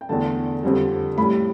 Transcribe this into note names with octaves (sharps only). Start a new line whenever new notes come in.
G5
E2 D3 A3 A5
F2 D3 G3
A2 G3 B5